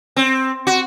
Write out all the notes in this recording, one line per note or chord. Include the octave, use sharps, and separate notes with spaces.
C4
F#4